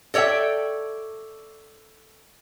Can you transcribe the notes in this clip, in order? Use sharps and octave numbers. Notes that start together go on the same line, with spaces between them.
A4 C#5 D5 E5 G5